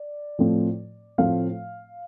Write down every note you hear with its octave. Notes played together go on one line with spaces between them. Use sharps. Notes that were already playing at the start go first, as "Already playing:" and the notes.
Already playing: D5
A2 F3 A3 C4
A2 F3 A3 C4 F5